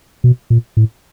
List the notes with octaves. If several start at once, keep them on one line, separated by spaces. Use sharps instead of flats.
B2
A#2
A2